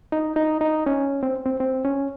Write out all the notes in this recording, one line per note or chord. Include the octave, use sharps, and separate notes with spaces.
D#4
D#4
D#4
C#4
C4
C4
C4
C#4